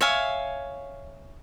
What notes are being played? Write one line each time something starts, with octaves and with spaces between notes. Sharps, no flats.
C#5 E5 F5 G#5